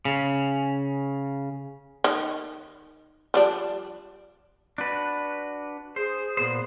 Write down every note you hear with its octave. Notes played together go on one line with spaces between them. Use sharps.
C#3
D#3
F3 G3 D4
D4 F#4 B4
G#4 C5
A#2 B3 C5